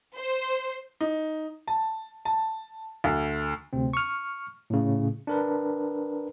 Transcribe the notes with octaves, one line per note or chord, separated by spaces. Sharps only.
C5
D#4
A5
A5
D2
D2 C3 C4
C#6 F6
A2 C#3
D4 A#4 B4